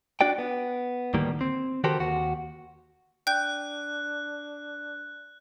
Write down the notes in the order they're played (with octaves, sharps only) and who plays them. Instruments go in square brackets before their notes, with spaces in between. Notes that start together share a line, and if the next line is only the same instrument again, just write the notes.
[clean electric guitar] D4 F#4 D5 G5
B3
D2 A2 D#3 G3 A#3
C4
D#3 F#4 G4 A4 A#4 C5
D#2 F#4
[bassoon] D4 [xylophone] G5 G6 [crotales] F#6